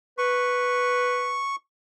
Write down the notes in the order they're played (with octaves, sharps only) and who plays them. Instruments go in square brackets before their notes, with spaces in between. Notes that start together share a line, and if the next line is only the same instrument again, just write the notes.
[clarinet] B4 [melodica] C#6